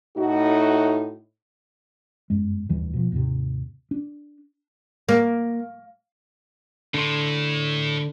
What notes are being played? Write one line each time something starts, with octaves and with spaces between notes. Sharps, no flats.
A2 D#4 F#4
G1 F#2 G#3
F1 D#2 E3 G3
B2 F3
D#2 G#2 C3
D4
A#3
A2 D3 C6